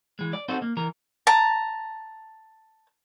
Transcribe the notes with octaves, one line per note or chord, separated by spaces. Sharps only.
E3 G#3
D5
C4 D#4 F#4 A4 C5
A#3
E3 A#4
A5 A#5